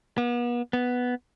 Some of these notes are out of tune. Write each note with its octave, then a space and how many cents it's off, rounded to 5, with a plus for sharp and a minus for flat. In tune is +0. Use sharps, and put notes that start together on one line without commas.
B3 -40
B3 +0